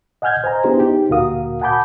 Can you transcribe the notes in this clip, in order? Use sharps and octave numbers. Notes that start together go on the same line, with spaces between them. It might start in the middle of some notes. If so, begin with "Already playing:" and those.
D#5 F#5 G#5 F6 G6 G#6
C5 D#5 G#5 A#5
B3 D4 E4 G4 G#4 C5
D#4 G4
D2 A#2 F#4 A#4 F5 D#6
F#5 G#5 A5 B5 D6 G6